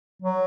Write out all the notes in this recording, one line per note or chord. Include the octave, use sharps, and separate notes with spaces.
F#3